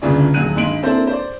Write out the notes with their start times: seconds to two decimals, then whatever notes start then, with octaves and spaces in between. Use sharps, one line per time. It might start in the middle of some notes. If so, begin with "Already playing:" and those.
0.02 G1 D2 C#3 F4 G#4 D5
0.34 D#1 F#3 F#4 G#4 F#6 D#7
0.55 G#1 G2 G#3 C6 D7 F#7
0.83 A#3 C4 D4 E4 A4 C5
1.07 C5 D5